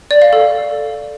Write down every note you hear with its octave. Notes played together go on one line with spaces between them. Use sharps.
D5
F5
A4